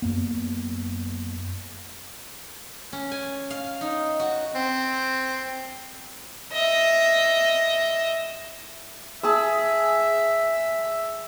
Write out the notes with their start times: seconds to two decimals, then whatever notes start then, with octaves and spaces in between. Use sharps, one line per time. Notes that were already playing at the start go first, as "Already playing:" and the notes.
0.02 F#2 A#3 B3
2.93 C#4
3.12 G#5
3.50 F5
3.81 D#4
4.20 F#4
4.55 C4
6.53 D#5 E5
9.23 G#4 E5 A5 E6